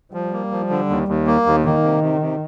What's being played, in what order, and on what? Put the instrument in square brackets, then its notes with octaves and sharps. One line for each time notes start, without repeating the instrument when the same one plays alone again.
[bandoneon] F3 [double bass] G3
[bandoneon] A#3
F3
D3
D#2
D#2
A#3
D#2
[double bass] D#3 [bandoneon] A#3
[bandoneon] C3
C3
C3